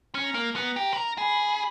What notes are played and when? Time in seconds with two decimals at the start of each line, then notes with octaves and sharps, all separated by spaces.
0.15 C#4
0.24 A#5
0.34 A#3
0.55 B3 A#5
0.76 G4
0.92 B4
0.96 A#4
1.18 G#4 B5